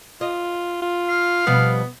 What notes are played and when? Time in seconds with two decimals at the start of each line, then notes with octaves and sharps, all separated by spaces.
0.21 F4 D#5
0.82 F4
1.09 F5
1.47 B2 F3 G3 B3